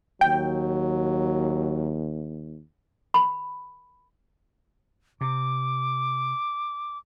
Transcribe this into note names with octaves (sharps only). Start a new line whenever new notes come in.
D#2 F#3 G5
B5
C3 D6